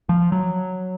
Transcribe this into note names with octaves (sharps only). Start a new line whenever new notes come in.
F3
F#3